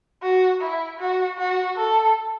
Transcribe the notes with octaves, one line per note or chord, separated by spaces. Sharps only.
F#4
E4
F#4
F#4
A4